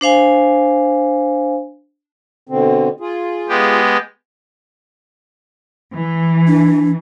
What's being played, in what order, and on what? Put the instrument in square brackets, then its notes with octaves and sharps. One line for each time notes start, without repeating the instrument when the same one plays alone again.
[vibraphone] D4 C5 F5 G#5
[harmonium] B2 D3 C4
F4 G#4
[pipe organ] G#3 B3 G4
[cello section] E3
[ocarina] D4